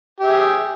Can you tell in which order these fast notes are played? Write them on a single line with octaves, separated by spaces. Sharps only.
G4 E5 G#4